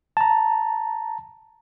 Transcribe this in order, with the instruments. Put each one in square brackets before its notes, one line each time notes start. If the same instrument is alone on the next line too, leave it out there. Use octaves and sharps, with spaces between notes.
[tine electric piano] A5 A#5